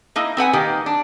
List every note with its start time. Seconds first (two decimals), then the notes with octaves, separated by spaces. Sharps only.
0.16 A#3 D#4 E4
0.37 C4 B4 F#5 G#5
0.53 D#3 A#3 G4
0.86 D4